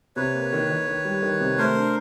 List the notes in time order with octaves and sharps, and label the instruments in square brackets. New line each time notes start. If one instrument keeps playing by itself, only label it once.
[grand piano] C3 [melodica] B4 C#5
[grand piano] A#3
D#3
D#3
D#3
G3
D#3
C3
[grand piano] A3 [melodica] A#4 C5
[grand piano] D4